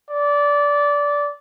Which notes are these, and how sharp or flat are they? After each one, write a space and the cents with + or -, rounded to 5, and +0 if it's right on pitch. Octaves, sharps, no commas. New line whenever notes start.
D5 -20